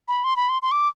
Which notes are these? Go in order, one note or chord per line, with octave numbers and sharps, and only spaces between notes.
B5
C6
B5
C6
C6
D6